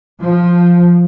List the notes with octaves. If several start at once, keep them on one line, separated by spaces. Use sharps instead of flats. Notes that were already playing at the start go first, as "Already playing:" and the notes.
F3